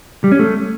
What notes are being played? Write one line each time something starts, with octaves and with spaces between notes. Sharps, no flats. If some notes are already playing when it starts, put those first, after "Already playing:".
G3
C#4
A3